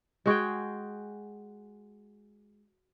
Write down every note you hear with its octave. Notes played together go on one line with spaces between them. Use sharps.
G#3 F#4 G#4 G5